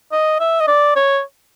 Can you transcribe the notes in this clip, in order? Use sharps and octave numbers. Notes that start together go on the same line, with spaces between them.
D#5
E5
D#5
D5
C#5